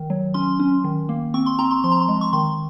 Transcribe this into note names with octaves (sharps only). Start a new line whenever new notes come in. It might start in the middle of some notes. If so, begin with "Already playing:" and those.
Already playing: D#3
F#3
C#4 C6
C#4
D#3
A#3
C4 C#6
C6
C4 A#5
C6
F3 C6
A#5
C6
G#3
C#6
D#3 C6